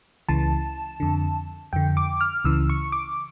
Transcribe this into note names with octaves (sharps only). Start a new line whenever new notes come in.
C#2 C#3 E3 A5
F2 D3
F2 D3 G5
D6
F6
C#2 C#3 E3 E6
C#6
D6